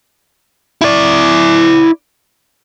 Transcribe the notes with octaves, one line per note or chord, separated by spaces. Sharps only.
E4 D5